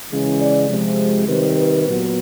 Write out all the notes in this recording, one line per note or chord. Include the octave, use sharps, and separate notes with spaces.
C#3 E3 G#3 C#4
D5
C3 F3 G#3
C3 D#3 G3 C4 B4
B4
A#2 F#3 B3